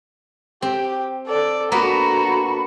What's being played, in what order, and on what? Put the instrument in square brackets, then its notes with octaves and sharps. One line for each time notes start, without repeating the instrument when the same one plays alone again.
[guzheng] C4 [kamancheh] G4
[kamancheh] A4 D5
[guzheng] A#3 B3 B4 [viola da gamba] D4 F#4 A4 [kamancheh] A#5 [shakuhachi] B5